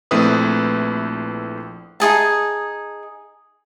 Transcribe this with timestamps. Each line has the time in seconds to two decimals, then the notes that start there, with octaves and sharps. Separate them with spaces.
0.11 A#1 A3 C4 E4 B4 D#6
2.00 D#4 F4 G#4 A5